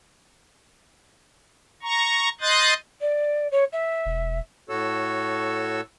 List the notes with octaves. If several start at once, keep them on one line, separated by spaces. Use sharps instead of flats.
A#5 C#6
D#5 C6 D#6 F#6 G6 A6
D5
C#5
E5
E1
A2 F#4 A4 C#5 E6